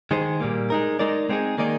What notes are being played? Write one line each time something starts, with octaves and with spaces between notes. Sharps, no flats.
D#3 G#3 D#4 G#4 C5
A#2 G3 A#3
G#3 D#4 A#4
G#3 D#4 A#4 D5
G#3 C4 D#4 G#4
D#3 A#3 D#4 G#4 D5